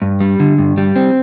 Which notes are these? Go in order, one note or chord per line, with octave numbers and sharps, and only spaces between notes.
G2
G3
D3
G2
G3
C4